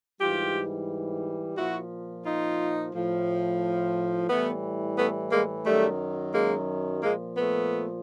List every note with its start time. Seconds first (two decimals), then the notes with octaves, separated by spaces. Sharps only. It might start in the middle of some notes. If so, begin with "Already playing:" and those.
0.20 G#2 E3 G3 F4 G4
1.57 A#2 F3 E4 F#4
2.25 D#4 F4
2.93 A2 F3
4.30 A2 E3 G3 A3 B3
4.99 A3 B3
5.32 G#3 A#3
5.66 F#2 D#3 F#3 G3 A3
6.34 G#3 A#3
7.03 A#2 F3 G#3 A#3
7.37 A3 B3